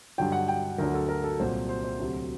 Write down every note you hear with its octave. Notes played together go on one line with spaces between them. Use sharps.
G2 D3 F#3 G5
F#5
G5
D2 D3 F#3 A#4
A4
A#4
A4
C2 A#2 F#3 C5
C5
C5
D2 C3 F#3